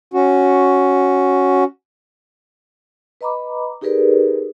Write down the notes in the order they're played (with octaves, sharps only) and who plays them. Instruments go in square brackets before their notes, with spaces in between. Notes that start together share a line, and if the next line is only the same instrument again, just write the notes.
[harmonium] C#4 F#4
[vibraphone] B4 D#5 A#5 B5 D6
D#4 G4 G#4 A#4 B4 D5